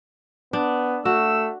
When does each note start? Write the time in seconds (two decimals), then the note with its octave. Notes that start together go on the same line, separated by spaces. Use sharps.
0.53 B3 D4
1.05 A3 F#4 E6